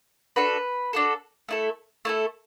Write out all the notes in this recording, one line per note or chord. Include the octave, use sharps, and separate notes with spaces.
D4 F#4 A4 B4
D4 F#4 A4
A3 E4 A4
A3 E4 A4